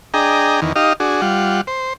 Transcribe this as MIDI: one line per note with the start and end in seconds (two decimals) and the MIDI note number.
0.14 0.60 62
0.14 0.60 68
0.14 0.60 75
0.14 0.60 79
0.14 0.60 82
0.62 0.73 40
0.62 0.73 51
0.76 0.93 63
0.76 0.93 67
0.76 0.93 75
0.76 0.93 77
1.00 1.21 62
1.00 1.21 66
1.00 1.21 68
1.21 1.61 55
1.21 1.61 65
1.21 1.61 78
1.67 1.93 72